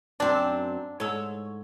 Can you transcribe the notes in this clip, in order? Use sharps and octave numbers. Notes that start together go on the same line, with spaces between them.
F#2 C4 D4
G#2 A4 C#5